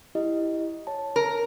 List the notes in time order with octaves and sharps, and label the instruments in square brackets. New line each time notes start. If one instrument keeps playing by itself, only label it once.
[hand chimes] E4 G4 D#5
C#5 A5
[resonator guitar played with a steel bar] A#4